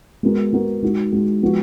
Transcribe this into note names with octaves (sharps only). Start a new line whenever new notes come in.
G#3 B3 F#4 A#4
G#3 B3 F#4 A#4
G#3 D#4 F#4
G#3 D#4 F#4
F3 G#3 B3 F#4